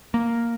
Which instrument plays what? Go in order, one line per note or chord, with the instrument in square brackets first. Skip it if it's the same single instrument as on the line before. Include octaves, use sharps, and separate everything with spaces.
[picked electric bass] A#3